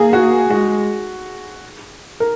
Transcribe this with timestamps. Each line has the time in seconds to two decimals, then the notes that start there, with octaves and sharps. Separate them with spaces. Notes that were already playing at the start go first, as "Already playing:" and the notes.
Already playing: A#3 G#4
0.13 F#4
0.50 G#3 F#4
2.20 A#4